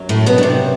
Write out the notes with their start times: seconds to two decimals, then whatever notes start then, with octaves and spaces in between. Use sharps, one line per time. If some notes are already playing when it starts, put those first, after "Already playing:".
Already playing: F#2 F#3
0.09 A2 A3
0.26 B2 B3
0.38 D4
0.43 C3 C4